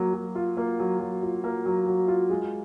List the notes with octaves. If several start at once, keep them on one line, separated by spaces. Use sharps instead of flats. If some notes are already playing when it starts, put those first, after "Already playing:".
Already playing: F#3 A#3
F#3
F4
A#3
F#3
F#3
F4
A#3
F#3
F#3
F4
G#3